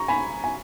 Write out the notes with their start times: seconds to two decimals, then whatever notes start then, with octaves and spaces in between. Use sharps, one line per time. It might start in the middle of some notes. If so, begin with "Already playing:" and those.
Already playing: A#5 C#6
0.08 G#5 B5
0.44 G#5